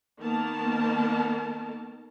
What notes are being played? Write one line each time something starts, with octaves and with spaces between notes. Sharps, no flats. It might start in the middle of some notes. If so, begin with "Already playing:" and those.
D#3 A#3 B3 A#4 A5